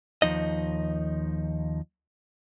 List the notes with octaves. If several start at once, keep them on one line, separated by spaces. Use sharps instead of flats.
D#2 F3 D#4 D#5